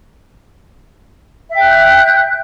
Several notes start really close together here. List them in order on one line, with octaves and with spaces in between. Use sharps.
E5 G5 F#6 G6